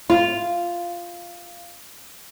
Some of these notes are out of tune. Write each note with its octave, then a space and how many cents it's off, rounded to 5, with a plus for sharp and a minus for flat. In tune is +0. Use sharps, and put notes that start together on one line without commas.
F4 -5